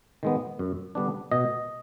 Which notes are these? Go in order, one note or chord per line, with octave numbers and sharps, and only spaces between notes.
D#3 G#3 B3
F#2
D3 G3 B3 D4
B2 D#5